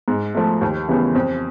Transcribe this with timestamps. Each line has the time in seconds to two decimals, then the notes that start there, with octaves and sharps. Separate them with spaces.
0.08 G#2
0.35 F3 A3
0.61 D#2
0.88 C#3 E3 G3 B3
1.15 F2